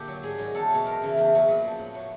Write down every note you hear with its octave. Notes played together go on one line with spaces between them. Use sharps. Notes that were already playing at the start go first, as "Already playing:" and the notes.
Already playing: A#2 D3 G4
F#3
G#2 G#4
D#3 F#3
E2 A4
B2 F#3
E2 A#4
C#3 E3
E2
B2 F#3
A#2 B4
F3
A2
F#3